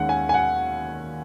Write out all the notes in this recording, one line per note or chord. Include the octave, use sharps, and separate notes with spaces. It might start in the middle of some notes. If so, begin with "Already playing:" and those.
Already playing: D#2 D#3 G#3 C#4 F#5
G#5
G#5
F#5